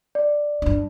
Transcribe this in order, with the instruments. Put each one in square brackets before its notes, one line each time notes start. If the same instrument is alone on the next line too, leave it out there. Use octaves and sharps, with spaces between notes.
[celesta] D5
[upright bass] G2 D4